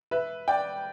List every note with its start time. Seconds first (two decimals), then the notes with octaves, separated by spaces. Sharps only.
0.11 B4 E5
0.48 D5 G5